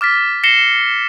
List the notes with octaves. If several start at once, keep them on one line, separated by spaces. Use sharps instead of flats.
D6 F6 A6 B6
A#6 C7 C#7 E7 G7